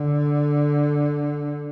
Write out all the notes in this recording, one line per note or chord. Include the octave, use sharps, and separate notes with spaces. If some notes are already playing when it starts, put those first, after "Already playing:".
Already playing: D3